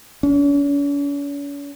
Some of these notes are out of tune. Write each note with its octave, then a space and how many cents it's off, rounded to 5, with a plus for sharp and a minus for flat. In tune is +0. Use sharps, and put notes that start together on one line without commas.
C#4 +45